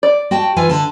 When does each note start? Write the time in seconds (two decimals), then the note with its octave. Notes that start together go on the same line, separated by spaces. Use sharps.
0.03 D5
0.31 F#4 G5 A5
0.56 E3 F4 G#5
0.70 D3 A5